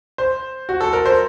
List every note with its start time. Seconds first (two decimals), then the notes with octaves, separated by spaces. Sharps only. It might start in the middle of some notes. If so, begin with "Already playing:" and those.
0.18 C5
0.69 F#4
0.81 A4
0.93 A#4
1.06 C5